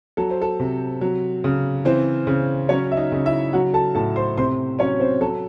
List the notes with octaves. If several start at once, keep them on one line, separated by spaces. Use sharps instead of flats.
F#3 A4
C5
A4
C3
F#3
C#3
E3 C4 C5
C#3
F#3 C#4 C#5
E5
D#4 D#5
C#3
E4 E5
F#3 F#4 F#5
A4 A5
A2 A4 A5
C5 C6
C3 C5 C6
F#3 C#4 C#5
C4 C5
F#3 A4